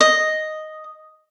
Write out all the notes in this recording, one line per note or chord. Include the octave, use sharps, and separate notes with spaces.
D#5